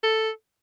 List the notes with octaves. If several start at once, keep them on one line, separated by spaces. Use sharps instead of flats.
A4